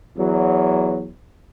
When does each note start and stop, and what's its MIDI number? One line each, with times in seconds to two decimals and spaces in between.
0.16 1.09 40
0.16 1.09 54